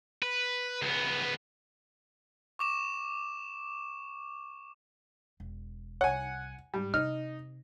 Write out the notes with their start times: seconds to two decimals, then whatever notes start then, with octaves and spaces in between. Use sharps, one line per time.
0.22 B4
0.82 C#2 B3
2.59 C#6 D6 E7
5.40 E1
6.01 C2 C#5 F#5 G#5
6.74 G#2 G3
6.94 C3 D#4 F6